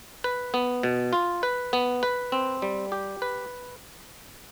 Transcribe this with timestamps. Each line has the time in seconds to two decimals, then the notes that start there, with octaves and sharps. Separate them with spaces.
0.24 B4
0.54 B3
0.83 B2
1.13 F4
1.43 B4
1.73 B3
2.03 B4
2.32 C4
2.62 G3
2.92 G4
3.22 B4